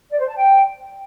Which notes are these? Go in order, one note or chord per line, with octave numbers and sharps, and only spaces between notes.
D5
C5
A5
G5